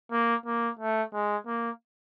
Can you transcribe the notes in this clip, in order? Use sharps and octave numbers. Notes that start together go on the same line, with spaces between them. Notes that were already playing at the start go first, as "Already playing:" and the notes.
A#3
A#3
A3
G#3
A#3